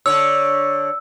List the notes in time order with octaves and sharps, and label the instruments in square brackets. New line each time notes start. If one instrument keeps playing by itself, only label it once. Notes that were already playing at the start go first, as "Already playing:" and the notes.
[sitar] D3 D4 C#5 [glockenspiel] E6